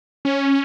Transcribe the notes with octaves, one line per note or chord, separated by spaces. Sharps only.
C#4